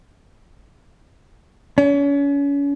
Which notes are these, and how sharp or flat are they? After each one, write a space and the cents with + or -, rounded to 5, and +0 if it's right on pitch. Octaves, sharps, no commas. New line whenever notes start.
C#4 +35